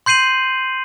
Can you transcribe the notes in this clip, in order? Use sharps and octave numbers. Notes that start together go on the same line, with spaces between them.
C6 G6 C7 D#7 F#7